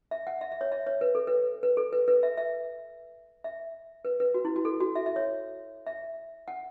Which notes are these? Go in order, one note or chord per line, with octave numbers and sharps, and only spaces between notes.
E5
F#5
E5
E5
C#5
E5
C#5
B4
A4
B4
B4
A4
B4
B4
E5
E5
E5
B4
B4
F#4
E4
F#4
A4
F#4
E5
E5
C#5
E5
F#5